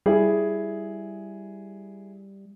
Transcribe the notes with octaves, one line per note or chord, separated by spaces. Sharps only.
G3 E4 G#4